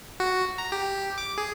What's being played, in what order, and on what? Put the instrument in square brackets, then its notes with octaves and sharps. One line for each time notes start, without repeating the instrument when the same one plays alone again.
[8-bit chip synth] F#4
A#5
G4
D6
G#4